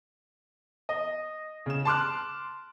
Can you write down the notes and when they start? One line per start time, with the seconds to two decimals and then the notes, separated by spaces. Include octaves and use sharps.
0.89 D#5
1.66 C#3 E7
1.85 A5 C6 D6 F6 F#6